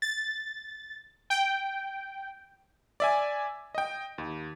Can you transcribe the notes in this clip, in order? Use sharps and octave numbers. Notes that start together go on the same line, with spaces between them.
A6
G5
D5 E5 G#5
D#5 G5
D#2